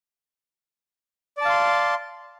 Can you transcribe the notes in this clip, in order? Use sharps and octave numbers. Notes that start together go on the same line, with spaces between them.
D5 F5 A5 C6